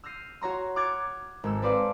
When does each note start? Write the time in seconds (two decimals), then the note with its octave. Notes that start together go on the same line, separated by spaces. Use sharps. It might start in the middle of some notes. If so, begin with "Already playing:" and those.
0.04 E6 F6 G6 A#6 C7 D#7
0.41 F#4 C#5 A#5 C6
0.76 D6 F6 F#6 G#6 A6 C#7
1.44 G#1 A4 E6
1.62 C4 A4 B4 C5 D5 F5